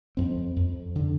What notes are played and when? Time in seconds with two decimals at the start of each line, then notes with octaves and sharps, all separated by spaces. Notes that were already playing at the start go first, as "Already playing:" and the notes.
0.17 F2 C4
0.56 F2
0.96 D3